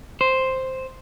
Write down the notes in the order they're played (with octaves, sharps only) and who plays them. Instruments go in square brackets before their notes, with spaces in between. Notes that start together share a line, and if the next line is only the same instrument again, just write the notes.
[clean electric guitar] C5